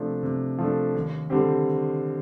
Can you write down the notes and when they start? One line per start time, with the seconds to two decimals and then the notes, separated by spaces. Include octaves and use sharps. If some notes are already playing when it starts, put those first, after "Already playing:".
Already playing: C3 F3 A3 D4
0.23 C3
0.59 F3 A3 D4
0.95 D#2
1.30 D3 G3 C4 G4